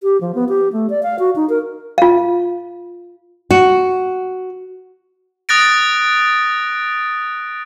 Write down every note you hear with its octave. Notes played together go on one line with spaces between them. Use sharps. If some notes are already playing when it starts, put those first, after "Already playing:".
G4
F3
B3
G4
A3
D5
F5
F#4
D#4
A#4
F4 F5
F#4
D#6 F#6 A6 A#6 D7